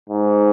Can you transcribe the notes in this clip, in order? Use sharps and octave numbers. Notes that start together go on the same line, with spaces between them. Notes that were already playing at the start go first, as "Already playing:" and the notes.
G#2